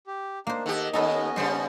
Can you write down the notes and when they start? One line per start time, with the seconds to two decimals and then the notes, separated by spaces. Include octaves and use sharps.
0.07 G4
0.47 A#3 D4 D#4 C5
0.66 D#3 G4 A4 F#5
0.93 D#2 B3 C#4 D#4 A4 B4 D#5
1.36 C#3 G3 G#4 C5